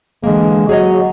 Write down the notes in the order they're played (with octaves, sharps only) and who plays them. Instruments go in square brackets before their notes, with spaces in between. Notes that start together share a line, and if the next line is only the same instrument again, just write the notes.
[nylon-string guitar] D3 E3 A#3 [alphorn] G#3
[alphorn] F#3 [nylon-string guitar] G#4 C#5 D#5